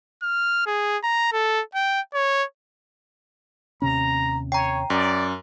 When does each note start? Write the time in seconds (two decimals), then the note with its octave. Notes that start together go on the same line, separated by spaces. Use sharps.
0.23 F6
0.66 G#4
1.04 A#5
1.33 A4
1.75 G5
2.14 C#5
3.82 D#2 C3 C#4 A#5
4.52 C#5 G5 A#5
4.90 F#2 D5